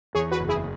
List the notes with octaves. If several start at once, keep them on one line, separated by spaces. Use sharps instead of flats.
E2 G#4 C#5
F#4 B4
F#1
E4 G#4